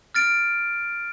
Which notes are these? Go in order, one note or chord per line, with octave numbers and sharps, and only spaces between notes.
F6 A6 D7